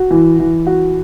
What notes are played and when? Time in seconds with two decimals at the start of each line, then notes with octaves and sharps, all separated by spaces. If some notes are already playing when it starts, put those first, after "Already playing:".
Already playing: F#4
0.11 E3
0.39 E3
0.67 F#4